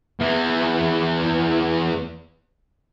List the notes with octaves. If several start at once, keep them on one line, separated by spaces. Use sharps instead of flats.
E2 E3